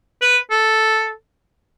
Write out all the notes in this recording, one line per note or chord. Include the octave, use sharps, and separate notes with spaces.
B4
A4